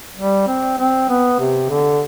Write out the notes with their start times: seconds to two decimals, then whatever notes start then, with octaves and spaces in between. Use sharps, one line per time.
0.16 G3
0.47 C4
0.78 C4
1.09 B3
1.39 C3
1.69 D3